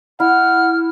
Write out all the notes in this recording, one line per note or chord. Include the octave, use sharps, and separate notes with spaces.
E4 F#5 F6